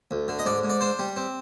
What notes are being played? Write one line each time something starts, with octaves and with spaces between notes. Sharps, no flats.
D2
D3
D#5
G#2 D5
G#2
D5
D4 C5
G3
C4